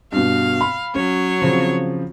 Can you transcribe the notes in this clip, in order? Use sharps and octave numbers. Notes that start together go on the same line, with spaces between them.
G2 B2 F5
B5
F#3 C#4 C#5
C#3 F3 C4